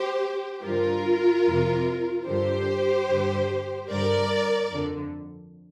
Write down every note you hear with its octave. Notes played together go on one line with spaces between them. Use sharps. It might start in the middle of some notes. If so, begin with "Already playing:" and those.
Already playing: G4 C5
G2 D3 F4 A#4
F2 C3
G2 D3 G4 C5
G2 D3
G2 D3 A#4 D5
F2 D3